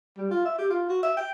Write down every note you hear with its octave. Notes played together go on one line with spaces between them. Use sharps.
G3
F4
E5
G4
F4
F#4
E5
G5